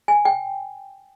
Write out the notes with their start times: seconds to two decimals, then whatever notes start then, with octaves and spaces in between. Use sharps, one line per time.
0.08 G#5
0.25 G5